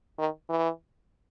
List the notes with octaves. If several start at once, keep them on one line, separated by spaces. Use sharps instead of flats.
D#3
E3